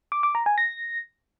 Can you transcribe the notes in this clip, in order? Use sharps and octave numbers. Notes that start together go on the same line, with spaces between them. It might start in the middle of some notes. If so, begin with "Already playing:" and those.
D6
D6
A#5
G#5
A#6